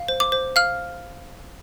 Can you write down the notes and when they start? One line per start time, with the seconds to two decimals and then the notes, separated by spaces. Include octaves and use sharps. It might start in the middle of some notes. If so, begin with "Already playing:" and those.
Already playing: F5
0.08 C5
0.20 D6
0.32 C5
0.56 F5 F6